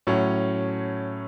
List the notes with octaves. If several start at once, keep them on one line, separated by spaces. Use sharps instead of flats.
A2 F#3 C#4